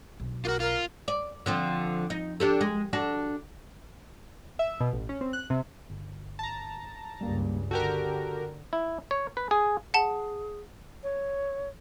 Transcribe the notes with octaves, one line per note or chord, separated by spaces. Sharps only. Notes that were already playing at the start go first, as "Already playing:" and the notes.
B1
F4 F#4 A#4
F4 A#4
D5
D3 F3 C4
D#4
D4 G4 A4
G#3
D4 F#4 A4
E5
B2
A1
C#4
C4
F#6
C3
G1
A5 A#5
C#2 G2 G3 A#3
D3 F#4 G4 A4 A#4
E4
C#5
B4
G#4
G#4 F#5 A5
C#5